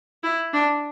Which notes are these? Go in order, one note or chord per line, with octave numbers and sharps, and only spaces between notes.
E4
D4